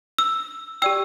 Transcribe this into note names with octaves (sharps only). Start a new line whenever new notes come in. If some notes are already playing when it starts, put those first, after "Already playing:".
E6
G4 D5 G5 E6